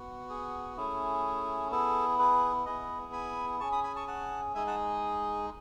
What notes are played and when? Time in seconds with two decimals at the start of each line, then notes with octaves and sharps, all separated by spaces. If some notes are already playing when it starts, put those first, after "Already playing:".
Already playing: B3 F#4
0.30 G#4
0.77 A3 C#4 E4 G#4
1.71 B3 E4 G#4 A4
2.19 G#4 B4
2.65 B3 E4 G#4 B4 D#5
3.13 G#5 B5
3.60 C#4 G#4 A5 C#6
3.72 B5 D#6
3.84 G#5 B5
3.96 A5 C#6
4.07 F#5 A5
4.55 G#3 D#4 G#4 E5 G#5
4.67 F#5 A5